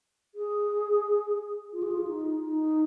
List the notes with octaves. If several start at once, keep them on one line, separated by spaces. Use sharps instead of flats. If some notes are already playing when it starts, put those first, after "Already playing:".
G#4
F4
G#4
F4
D#4
D#4